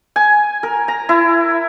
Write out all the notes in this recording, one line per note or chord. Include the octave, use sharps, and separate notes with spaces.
G#5
A#4
A#5
E4